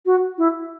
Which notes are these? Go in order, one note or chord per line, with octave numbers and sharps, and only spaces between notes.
F#4
E4